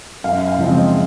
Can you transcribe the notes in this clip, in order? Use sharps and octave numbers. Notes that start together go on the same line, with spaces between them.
F#2 F5
F5
C#3 F3 G#3 C4
D#5